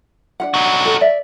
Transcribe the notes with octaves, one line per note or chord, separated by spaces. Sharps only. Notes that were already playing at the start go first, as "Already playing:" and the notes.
D4 F4 F#5
D#4 F#4
A4
D5 E5